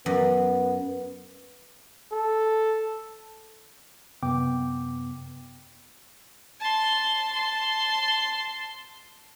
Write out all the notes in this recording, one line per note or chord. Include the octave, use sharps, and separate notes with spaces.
F#2 B3
A4
F#2 C3 B3 G5 D6
A5 C6
A5 C6